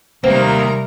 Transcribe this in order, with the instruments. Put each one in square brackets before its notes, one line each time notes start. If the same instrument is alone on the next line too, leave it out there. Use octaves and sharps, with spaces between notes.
[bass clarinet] C3 [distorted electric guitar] D#3 A#3 [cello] G3 A#4 [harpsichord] C4